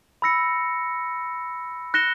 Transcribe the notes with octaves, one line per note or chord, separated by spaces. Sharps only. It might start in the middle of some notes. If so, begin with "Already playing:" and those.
B5 E6 A#6 C#7
F#6 A#6 C#7 E7 G7